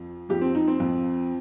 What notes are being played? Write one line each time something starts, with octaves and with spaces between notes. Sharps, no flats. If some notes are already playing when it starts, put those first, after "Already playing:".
Already playing: F2 F3
F2 F3 G4
C4
D#4
C4
F2 F3